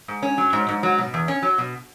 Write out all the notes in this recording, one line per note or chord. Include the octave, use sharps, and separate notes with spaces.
G#2
C#4
F#3
G#2
G#2
F#3
B2
E2
C#4
F#3
B2